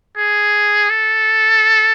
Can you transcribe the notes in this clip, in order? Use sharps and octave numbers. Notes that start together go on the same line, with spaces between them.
G#4
A4